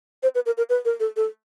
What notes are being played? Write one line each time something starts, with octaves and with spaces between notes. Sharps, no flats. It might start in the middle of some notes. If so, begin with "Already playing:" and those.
C5
B4
A#4
A#4
B4
A#4
A4
A4